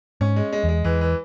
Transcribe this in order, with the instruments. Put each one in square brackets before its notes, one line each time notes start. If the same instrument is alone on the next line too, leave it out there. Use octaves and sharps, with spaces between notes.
[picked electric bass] G#2 [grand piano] C#4
[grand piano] G#3
G#3
[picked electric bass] E2 [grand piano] G#3
[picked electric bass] E2 [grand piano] E3
[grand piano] E3